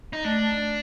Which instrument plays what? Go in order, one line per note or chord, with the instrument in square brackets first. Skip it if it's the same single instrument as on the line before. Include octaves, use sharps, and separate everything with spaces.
[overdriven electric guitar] D#4
[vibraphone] A3 [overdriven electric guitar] D4